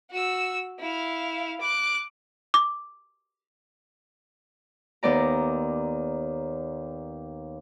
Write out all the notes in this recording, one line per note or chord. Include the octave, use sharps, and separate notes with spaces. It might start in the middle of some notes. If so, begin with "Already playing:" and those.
F#4 E6
E4 F5
D6 F#6
D6
D#2 B3 D5 A#5